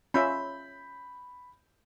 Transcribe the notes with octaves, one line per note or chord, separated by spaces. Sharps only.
C#4 F4 E5 B5 G6